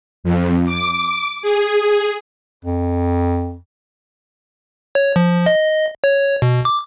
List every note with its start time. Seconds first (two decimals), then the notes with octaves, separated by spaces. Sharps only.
0.24 F2
0.66 D6
1.42 G#4
2.65 F2
4.95 C#5
5.16 F3
5.46 D#5
6.04 C#5
6.42 B2
6.65 D6